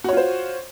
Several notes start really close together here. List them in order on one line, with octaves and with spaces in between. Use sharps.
F#4 C#5 F4 C5